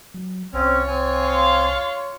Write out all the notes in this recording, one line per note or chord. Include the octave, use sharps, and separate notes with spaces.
F#3
C2 C4 C#4 F4 C#5
C4 G#5
F5 C6